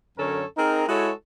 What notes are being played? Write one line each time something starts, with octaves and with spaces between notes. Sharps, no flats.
F#2 D3 C#4 A4 A#4 C#5
C4 D#4 G#4 A#4
G#3 E4 F#4 A4 C#5